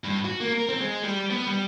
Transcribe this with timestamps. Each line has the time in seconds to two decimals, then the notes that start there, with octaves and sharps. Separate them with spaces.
0.04 G2
0.25 F#4
0.40 A#3
0.56 A#4
0.69 C4
0.80 G#3
1.03 G3
1.30 B3
1.47 G3